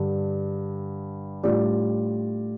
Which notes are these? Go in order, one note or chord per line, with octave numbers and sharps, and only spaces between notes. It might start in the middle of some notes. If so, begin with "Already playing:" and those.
Already playing: G2 D3 G3 D4
A2 G3 D4 F4 D5